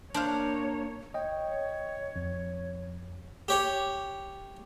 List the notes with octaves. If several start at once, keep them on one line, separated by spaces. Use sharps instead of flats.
A#3 D4 C5 C#5 F5
C#5 D#5 G5
F2
G4 C#5